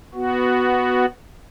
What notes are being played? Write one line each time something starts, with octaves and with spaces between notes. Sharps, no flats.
B3 F#4